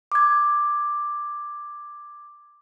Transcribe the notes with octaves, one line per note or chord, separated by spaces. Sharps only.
D6 G#6